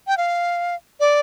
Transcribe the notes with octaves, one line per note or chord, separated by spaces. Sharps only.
G5
F5
D5